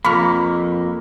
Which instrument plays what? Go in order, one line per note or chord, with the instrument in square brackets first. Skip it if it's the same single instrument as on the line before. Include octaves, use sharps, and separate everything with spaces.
[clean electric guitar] F2 A#3 [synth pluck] B5 C#6 F6